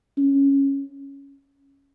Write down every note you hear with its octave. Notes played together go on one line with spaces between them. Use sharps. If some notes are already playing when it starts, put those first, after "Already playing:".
C#4